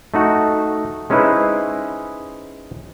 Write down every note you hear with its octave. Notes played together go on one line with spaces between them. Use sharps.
A3 D#4 F#4
G#3 C#4 D#4 E4 B4 C5